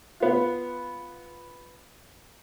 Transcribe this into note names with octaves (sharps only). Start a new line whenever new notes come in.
B3 F4